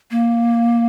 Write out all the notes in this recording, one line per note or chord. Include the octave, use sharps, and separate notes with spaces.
A#3